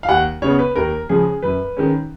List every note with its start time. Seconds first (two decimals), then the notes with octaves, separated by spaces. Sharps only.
0.03 F5
0.08 D#2 F#5
0.42 C#3 G#3 B3 C#5
0.59 B4
0.76 D#2 A#4
1.09 C#3 F3 G#3 C#4 G#4
1.42 F#2 B4
1.77 D#3 G#3 C#4